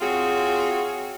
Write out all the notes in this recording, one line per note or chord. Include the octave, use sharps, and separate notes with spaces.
C4 F4 F#4 G#4 C#5